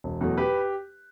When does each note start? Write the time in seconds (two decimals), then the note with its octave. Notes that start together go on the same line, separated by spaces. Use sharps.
0.04 E1
0.21 E2 B2 F#3 A3
0.37 G4 B4